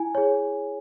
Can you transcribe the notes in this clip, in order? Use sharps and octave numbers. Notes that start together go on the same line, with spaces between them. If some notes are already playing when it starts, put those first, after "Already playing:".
Already playing: E4 G#5
G#4 C#5